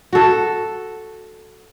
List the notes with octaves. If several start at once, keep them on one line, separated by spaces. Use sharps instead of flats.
F#4 A4